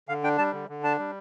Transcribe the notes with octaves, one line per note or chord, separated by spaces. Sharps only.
D3 F5
D4 G5
G3 A5
D3
D3
D4 A5
G3